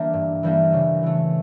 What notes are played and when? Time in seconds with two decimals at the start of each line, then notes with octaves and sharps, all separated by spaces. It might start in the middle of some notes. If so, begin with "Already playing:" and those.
Already playing: E3 G3 A#3 D4
0.13 G2
0.43 E3 G3 A#3 D4
0.73 C#3
1.03 E3 A3